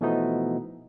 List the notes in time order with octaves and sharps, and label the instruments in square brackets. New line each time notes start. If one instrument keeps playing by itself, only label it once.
[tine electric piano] B2 E3 F3 A3 B3 D#4